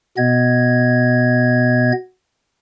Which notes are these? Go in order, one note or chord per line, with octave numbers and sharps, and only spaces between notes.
B2 B3 D#5 G#6